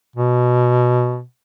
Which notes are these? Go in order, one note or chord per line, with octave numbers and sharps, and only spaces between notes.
B2